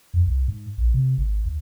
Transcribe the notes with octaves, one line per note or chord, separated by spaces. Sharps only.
F2
C2
G#2
A#1
C3
G#1
D2